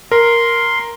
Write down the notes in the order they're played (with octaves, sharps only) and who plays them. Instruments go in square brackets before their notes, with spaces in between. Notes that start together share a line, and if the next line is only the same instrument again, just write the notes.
[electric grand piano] A#4 [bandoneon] C6